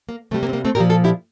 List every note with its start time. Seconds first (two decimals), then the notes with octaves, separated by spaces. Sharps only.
0.09 A#3
0.31 C3 A3
0.34 G3
0.43 A#3
0.49 C4
0.53 A#3
0.65 A3 C4
0.75 A#2 G4 A#4
0.80 F3
0.89 F4 A4
1.04 E4 G4